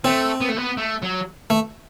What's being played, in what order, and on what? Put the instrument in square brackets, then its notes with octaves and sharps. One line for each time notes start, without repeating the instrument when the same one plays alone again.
[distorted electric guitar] A3 [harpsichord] C4
[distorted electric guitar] B3
A3
B3
A3
F#3
[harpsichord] A3